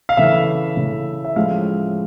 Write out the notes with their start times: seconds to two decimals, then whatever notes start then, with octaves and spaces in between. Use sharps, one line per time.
0.09 F5
0.17 C#3 E3 A3 E5
0.77 C#3 E3 A3
1.25 E5
1.36 A2 F3 G#3 C#4 F5